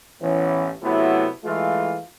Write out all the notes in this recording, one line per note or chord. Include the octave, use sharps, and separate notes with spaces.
A1 E3 B3 C#4
C3 F#3 A3 B3 E4
E3 G#3 A3 F4